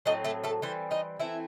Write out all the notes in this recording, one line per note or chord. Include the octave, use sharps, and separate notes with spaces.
A2 F#3 C4 D#5
A3 A4
A3 A4
E3 G3 C4 C5
D#4 D#5
E3 A3 C4 E4 E5